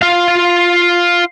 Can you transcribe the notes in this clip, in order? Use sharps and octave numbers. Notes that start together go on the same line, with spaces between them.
F4 F5